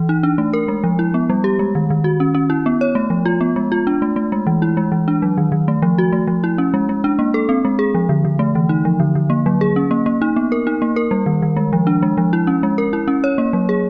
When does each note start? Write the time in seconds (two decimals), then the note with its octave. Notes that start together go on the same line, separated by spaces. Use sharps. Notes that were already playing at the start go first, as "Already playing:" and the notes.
Already playing: E3
0.09 D#4
0.23 D4
0.38 A3
0.53 A#4
0.68 G#3
0.84 F3
0.99 E4
1.14 B3
1.30 G3
1.44 G4
1.59 G#3
1.75 D#3
1.90 D#3
2.04 F#4
2.20 C#4
2.35 C#4
2.50 E4
2.66 B3
2.81 C#5
2.95 A3
3.10 F3
3.25 F4
3.41 B3
3.56 G#3
3.72 F4
3.87 D4
4.02 A3
4.16 A3
4.32 G#3
4.47 E3
4.62 E4
4.77 G#3
4.92 E3
5.08 D4
5.22 F#3
5.38 D#3
5.52 D#3
5.68 A3
5.82 F3
5.98 F#4
6.13 A3
6.27 F3
6.44 E4
6.58 C#4
6.74 G#3
6.89 G#3
7.04 D4
7.19 A#3
7.34 A4
7.49 C4
7.65 G#3
7.79 G#4
7.95 F3
8.09 D3
8.25 D3
8.39 A3
8.55 E3
8.69 D#4
8.85 F3
9.00 D3
9.15 D3
9.30 A#3
9.46 F#3
9.61 G#4
9.76 C#4
9.91 A#3
10.06 A#3
10.22 D#4
10.36 B3
10.52 A#4
10.67 D#4
10.82 A#3
10.96 A#4
11.11 G3
11.26 D#3
11.42 D#3
11.57 G#3
11.73 F3
11.87 D4
12.03 G#3
12.17 F3
12.33 E4
12.47 C#4
12.63 G#3
12.78 A#4
12.93 E4
13.08 C#4
13.24 C#5
13.38 A#3
13.53 F#3
13.69 G#4